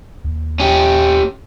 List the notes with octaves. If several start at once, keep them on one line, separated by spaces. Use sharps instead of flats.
D#2
C#4 G4